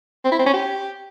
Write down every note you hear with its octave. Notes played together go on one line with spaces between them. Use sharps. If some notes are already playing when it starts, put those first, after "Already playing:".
C4
E4
C4
C#4
G4